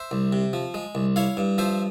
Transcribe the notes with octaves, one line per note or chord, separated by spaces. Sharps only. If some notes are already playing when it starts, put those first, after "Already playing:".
Already playing: C5 E5
C2
C3
F3
G#3
C2
E4 C#5 F5
G2
F3 C5 E5